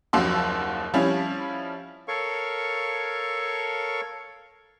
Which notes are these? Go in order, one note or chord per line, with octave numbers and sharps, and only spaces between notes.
F#1 D#2 F3 F#4 C6 E6
F3 G3 C#4 E4
A4 A#4 C#5 F5 C#6